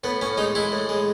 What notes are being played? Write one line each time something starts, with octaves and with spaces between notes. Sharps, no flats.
A2 B3
A2 C#4
G#3 D#4
G#3 E4
A2
G#3